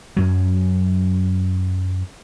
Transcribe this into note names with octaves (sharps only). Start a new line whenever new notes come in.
F#2 F#3